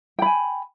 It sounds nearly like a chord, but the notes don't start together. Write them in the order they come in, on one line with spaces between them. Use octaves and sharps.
G5 B5 G#5